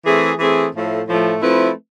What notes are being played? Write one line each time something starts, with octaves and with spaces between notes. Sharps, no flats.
E3 A3 C4 G#4
E3 A3 C4 G#4
A2 F3 A3
A2 F3 A3
F3 A3 C4 E4 B4